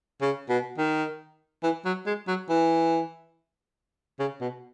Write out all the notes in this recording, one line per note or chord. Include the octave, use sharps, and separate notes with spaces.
C#3
B2
D#3
E3
F#3
G#3
F#3
E3
C#3
B2